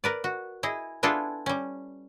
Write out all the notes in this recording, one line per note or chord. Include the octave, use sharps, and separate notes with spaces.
A#4 B4 D5
F#4
E4 G#4 D#5
B3 D4 E4 F4 G#4 A4
G3 C#4